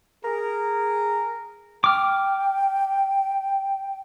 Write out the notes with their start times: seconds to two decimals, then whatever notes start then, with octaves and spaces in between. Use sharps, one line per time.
0.24 G#4 A#4
1.84 G5 D6 F6